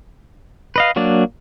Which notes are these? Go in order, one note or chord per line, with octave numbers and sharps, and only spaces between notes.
B4 D#5 F5
F#3 A#3 D4 D5